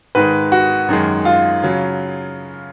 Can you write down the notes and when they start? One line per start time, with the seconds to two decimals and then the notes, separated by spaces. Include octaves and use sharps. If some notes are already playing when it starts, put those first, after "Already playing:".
0.15 G#2 D#3 G#3 B4
0.52 F#4
0.89 F#2 D#3 G#3
1.25 F4
1.63 C#3 F#3